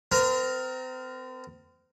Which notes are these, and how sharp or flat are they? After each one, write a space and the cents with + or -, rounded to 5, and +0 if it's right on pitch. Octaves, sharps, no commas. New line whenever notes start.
C4 -35 A#4 +0